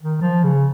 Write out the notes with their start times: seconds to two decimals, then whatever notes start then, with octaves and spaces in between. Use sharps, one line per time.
0.01 D#3
0.21 F3
0.44 C#3